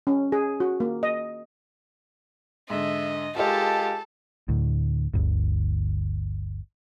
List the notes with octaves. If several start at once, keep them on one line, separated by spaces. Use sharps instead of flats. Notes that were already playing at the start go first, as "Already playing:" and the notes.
C#4
G#4
F#4
A#3
D#5
G#2 D3 D#5 E5
G#3 F4 G4 A4 A#4 D#5 A5
D2 A2
G1 D2